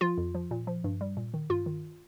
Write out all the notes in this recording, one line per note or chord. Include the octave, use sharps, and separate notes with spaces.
F3 F4
F2
F3
A#2
F3
G2
G3
A#2
D#3
G2 F4
D#3